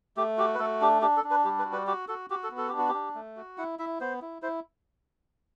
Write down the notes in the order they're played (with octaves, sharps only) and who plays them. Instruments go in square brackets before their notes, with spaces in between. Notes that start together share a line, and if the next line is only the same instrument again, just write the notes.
[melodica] A3 G4
F#4 G4
B4
A3 A4
D4 G4
D4 G4
A4
D4
B4
G3 G4
B4
F#4
B4
F#4 G4
F#4 A4
F#4 G4
A4
B3
A4
D4 G4
F#4
G4
D4
A3
F#4
E4 F#5
E4 E5
B3 C5
E4
E4 C5